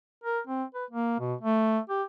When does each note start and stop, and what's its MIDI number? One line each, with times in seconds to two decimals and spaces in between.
0.24 0.40 70
0.47 0.64 60
0.75 0.85 71
0.91 1.19 58
1.20 1.34 47
1.41 1.79 57
1.90 2.03 67